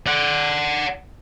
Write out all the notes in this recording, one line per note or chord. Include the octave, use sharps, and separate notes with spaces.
D5 F#5